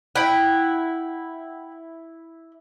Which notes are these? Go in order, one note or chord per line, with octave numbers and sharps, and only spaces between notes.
E4 F#5 G5 B5